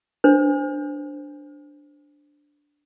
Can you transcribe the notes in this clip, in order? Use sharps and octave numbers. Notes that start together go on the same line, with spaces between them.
D4 C5